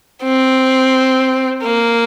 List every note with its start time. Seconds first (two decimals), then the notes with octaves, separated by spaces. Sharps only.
0.23 C4
1.63 A#3